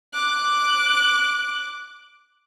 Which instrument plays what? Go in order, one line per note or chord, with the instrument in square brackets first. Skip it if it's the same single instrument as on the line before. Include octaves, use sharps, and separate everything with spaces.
[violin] D6 F#6